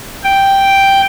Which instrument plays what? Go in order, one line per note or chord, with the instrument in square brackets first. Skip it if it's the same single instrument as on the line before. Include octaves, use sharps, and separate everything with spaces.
[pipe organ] G5